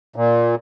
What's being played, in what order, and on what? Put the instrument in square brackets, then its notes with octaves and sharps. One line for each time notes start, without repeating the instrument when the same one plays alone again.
[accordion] A#2